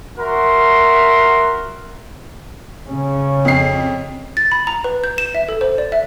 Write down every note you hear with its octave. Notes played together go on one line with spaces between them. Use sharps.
F#4 A#4 E5 C6
C#3 C#4
F2 C7
A6
B5
A#5
B4
G6
E7
E5
A4
C5
D5
E5